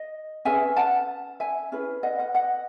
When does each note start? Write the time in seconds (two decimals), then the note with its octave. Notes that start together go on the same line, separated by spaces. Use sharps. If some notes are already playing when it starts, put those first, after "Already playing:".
Already playing: D#5
0.45 C#4 G#4 B4 E5 G#5
0.76 F#5 A5
1.40 E5 G#5
1.72 C#4 E4 G#4 B4
2.03 D#5 F#5
2.19 D#5 F#5
2.35 D#5 F#5